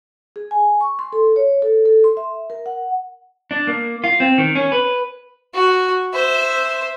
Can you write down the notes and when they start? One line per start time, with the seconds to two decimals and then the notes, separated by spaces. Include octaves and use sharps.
0.36 G#4
0.51 G#5
0.81 C#6
0.99 C6
1.13 A4
1.36 C#5
1.62 A4
1.86 A4
2.04 C6
2.17 E5
2.50 A#4
2.66 F#5
3.51 D4
3.67 A#3
4.04 F4
4.20 C4
4.38 D#3
4.55 C#4
4.72 B4
5.54 F#4
6.13 C5 E5